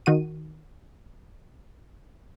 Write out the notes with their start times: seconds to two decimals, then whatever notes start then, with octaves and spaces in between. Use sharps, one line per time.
0.06 D#3 F#4 D#7